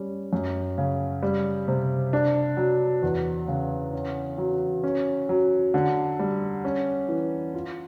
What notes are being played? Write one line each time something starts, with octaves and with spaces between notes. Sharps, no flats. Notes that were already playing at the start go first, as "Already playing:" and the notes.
Already playing: G3 C#4
F#2
C#3
G3
C3
D4
F#3
E2
C#3
C#4
F#3
C#4
F#3
D3
G3
C#4
E3
F4